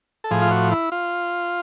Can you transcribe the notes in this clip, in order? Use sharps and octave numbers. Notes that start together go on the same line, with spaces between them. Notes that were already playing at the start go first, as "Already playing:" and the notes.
A4
A2 F3 G#4
F4
F#4
E4
F4